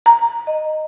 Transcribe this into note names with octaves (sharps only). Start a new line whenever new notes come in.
A#5
D#5